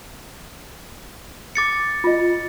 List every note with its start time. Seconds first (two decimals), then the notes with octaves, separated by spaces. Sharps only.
1.55 D6 A6 C#7
2.04 F4 D#5